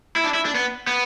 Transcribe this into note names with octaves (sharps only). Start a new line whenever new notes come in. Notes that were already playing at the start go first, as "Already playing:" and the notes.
E4
D4
E4
D4
B3
B3